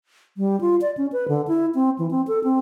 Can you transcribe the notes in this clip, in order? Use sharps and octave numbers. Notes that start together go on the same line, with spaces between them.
G3
F4
D5
C#4
B4
D3
E4
C4
E3
C4
A4
C4